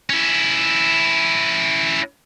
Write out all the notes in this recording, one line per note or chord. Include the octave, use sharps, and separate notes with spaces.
C#4 E4